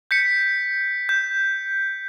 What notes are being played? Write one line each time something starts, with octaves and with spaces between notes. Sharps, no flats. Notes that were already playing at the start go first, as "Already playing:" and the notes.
G6 B6 C#7
G6